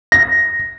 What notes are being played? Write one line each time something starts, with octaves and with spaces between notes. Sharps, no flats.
A#6